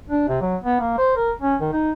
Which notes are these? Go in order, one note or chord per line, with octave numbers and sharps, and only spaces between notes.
D4
C3
F#3
B3
A#3
C5
A#4
C#4
D#3
D#4